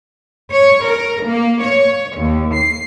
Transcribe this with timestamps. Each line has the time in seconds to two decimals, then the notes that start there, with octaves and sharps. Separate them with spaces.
0.52 C#5
0.86 A#4
1.26 A#3
1.64 C#5
2.17 D#2
2.54 C7